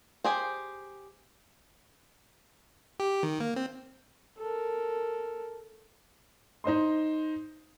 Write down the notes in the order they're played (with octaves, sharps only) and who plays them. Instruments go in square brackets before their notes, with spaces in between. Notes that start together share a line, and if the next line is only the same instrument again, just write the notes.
[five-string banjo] G4 G#4 C5
[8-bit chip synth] G4
D#3
A#3
C4
[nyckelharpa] A4 A#4
[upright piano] D#4 C5 D#5 C6